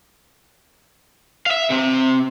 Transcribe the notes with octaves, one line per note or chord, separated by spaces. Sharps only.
E5 F5
C3 C4